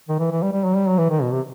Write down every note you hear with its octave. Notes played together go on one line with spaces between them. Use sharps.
D#3
E3
E3
G3
G3
F#3
G3
F#3
E3
D#3
B2
C3